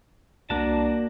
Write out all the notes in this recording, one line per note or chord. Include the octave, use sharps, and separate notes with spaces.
C2 A#3 D4 F#4 A5